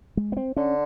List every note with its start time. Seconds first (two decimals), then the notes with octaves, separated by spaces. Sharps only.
0.17 G#3
0.32 B3
0.37 C4
0.57 D3 C#4